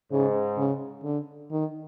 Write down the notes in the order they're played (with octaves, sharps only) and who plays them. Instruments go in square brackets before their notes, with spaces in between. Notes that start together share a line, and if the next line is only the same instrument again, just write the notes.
[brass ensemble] G#2 [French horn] C#3
[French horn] C#3
D3
D#3